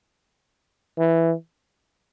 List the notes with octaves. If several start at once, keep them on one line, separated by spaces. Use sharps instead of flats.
E3